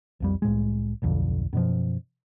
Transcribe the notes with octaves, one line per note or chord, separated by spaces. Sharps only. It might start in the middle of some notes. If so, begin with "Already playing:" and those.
B1 F2 G3
C2 A2 G#3
D1 B1 F2 D3
F#2 B2 F3